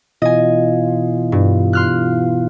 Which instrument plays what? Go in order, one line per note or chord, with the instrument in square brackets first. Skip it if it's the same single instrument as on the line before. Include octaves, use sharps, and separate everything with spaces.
[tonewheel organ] B2 E3 F4 [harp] D#5 G#5
[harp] G2
C6 F6 F#6